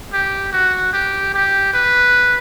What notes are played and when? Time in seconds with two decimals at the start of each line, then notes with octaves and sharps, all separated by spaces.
0.13 G4
0.53 F#4
0.93 G4
1.34 G4
1.74 B4